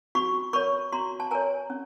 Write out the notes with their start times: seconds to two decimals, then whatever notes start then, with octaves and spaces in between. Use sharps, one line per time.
0.15 F#4 B5 C#6
0.53 A#4 C#5 B5 C#6
0.92 F#4 A#5 C6
1.20 A5
1.31 A#4 C#5 G#5 A#5
1.70 C#4